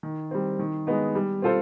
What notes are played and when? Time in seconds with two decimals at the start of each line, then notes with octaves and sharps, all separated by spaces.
0.03 D#3
0.31 G3 C4
0.59 D#3
0.87 G#3 B3 D#4
1.15 G3
1.42 C4 F4 A4 C5